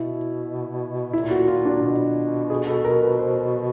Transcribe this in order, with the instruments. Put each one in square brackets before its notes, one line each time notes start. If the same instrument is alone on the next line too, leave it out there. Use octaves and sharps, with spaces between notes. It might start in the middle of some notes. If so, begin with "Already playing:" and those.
Already playing: [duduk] B2 [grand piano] E4
[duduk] A#2 [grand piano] E4
[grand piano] F#4
F4
D4
[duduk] B2
[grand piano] G#4
A4
A#4
B4
C5